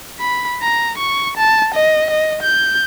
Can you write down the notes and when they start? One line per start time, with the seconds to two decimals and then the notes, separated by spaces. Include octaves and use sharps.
0.19 B5
0.61 A#5
0.98 C#6
1.37 A5
1.74 D#5
2.10 D#5
2.43 G6